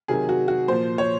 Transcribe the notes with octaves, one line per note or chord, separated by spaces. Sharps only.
C3 D#3 F#3 G#4
F#4
F#4
A#2 F3 C5
C#5